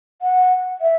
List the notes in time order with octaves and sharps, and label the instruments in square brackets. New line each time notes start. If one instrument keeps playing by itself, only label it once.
[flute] F#5
E5